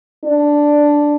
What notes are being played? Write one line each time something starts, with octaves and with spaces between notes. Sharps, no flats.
D4